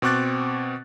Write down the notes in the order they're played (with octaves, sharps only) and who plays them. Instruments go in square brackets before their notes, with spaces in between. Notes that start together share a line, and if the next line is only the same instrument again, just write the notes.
[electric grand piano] B2 C4 C#6 D6 F#6 A6